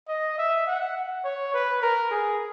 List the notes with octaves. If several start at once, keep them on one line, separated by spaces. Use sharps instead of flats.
D#5
E5
F#5
C#5
B4
A#4
G#4